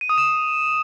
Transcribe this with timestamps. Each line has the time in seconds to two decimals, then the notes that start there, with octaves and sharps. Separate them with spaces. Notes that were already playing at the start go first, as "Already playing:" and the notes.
0.01 D#7
0.09 D#6
0.18 E7